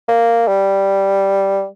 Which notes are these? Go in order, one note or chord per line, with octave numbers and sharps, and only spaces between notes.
A#3
G3